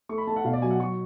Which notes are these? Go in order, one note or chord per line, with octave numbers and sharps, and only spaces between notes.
A3 C#6
B5
A3 A5
F#5
B2 F5
D5
F#3 G#5
F#5
F#3 C#6